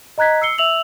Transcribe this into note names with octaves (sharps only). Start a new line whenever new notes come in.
D#5 A#5 F#6 G#6 B6
E6 C7 C#7 G7
E5 E6 F7 F#7